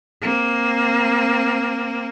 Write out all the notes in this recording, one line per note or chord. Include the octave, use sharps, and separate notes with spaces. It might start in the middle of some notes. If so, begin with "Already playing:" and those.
A#3 C4